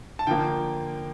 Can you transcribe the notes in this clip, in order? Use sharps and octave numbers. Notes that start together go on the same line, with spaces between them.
A5
D3 F3 A#3 G5